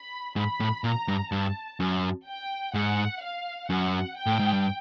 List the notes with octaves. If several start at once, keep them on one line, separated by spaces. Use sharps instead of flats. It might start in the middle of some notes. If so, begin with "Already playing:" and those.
Already playing: B5
G#2 B5
A2
A#2 A#5
G2
G2 A5
F#2
G5
G#2 F#5
F5
F#2 F#5
G5
A2
G#2
G2